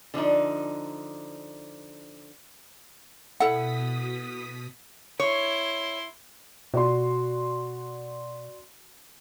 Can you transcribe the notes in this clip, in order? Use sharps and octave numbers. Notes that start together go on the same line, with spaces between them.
D3 F3 D4 D#4
B2 E4 A4 F#5 D#6 B6
E4 C#5 C6
B2 F#4 D5 C6